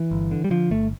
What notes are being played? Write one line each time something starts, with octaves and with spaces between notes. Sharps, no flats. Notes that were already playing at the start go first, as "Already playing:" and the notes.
Already playing: E3
G1
D3
G3
D3 F3
G1 A3